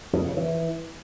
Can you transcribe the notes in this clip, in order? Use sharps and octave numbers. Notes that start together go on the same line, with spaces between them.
F2
C#3
E3